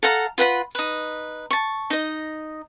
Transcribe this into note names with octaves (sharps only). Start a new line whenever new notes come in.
A4 F5 F#5 A#5
F4 B4 F#5 B5
D#4 B4
A5 C#6
D#4 D#5